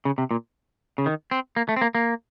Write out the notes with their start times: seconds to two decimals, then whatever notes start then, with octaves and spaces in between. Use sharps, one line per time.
0.05 C#3
0.18 C3
0.31 A#2
0.98 C#3
1.06 D#3
1.31 C4
1.56 A#3
1.69 A3
1.76 C4
1.81 A#3
1.95 A#3